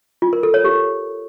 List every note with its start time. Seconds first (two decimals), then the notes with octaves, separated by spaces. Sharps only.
0.22 F4
0.33 A#4
0.43 A4
0.54 C#5
0.64 G4